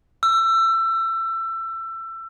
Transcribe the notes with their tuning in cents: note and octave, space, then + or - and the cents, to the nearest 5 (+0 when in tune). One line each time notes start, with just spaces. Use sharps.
E6 +25